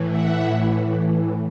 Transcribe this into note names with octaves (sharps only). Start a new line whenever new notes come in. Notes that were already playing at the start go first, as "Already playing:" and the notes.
Already playing: A2 E3
E5 F#5